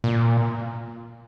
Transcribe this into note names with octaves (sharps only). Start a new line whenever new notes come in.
A#2